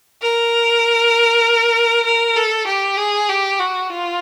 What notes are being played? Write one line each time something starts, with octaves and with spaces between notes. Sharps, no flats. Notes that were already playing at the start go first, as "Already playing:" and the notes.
A#4
A#4
A4
G4
G#4
G4
F#4
F4